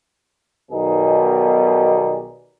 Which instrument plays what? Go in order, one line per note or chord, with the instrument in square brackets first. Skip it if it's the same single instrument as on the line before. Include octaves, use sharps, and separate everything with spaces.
[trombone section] B1 B2 D#3 G3 D#4 G#4